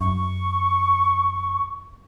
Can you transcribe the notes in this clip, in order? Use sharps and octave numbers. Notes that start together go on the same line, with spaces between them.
F#2 C#6